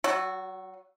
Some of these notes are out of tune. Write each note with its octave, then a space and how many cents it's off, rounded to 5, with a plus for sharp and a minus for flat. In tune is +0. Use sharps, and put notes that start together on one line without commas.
F#3 +35 F#4 -10